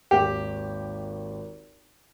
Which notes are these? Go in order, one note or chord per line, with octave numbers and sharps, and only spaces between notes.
G#1 D#2 G4